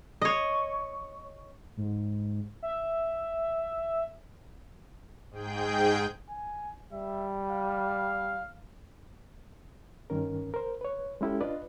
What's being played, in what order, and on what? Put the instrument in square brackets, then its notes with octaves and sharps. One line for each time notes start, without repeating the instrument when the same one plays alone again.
[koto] C#5 D#5
[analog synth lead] G#2
E5
[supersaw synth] G#2 G#4 G5 G6
[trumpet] G#5
[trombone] G3 [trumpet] E5
[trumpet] F5
[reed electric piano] G2 D#3 C#4 A#4
A#4 C5
B4 C#5
G#3 C#4 E4 G4 A4
D4 F4 B4 D5 D#5